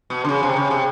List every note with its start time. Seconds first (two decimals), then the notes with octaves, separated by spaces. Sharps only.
0.10 B2
0.25 D3
0.29 C#3
0.43 C3
0.56 C#3
0.71 C3